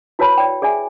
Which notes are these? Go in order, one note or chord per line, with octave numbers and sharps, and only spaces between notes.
E4 F#4 B4 C#5 A5 B5
D5 G5
G#4 D5 E5 G#5